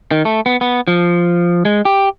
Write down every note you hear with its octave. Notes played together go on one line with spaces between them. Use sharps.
D#3
A3
B3
B3
F3
G#3
G4